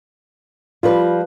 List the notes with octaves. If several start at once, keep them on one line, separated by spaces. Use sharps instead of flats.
F3 G3 F4 B4